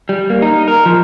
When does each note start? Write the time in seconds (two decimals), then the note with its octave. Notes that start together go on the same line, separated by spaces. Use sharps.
0.09 G3
0.30 A#3
0.42 D#4
0.68 A#4
0.86 F3